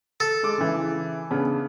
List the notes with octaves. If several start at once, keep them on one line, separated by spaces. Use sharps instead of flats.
A4
G#3 D6
C#3 E3
C#3 B3 D4